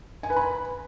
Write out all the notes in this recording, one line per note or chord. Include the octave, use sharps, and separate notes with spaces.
G#5
B4
B5